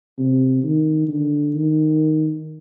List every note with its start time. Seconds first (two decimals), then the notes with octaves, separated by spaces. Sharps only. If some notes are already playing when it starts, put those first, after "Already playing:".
0.18 C3
0.64 D#3
1.08 D3
1.55 D#3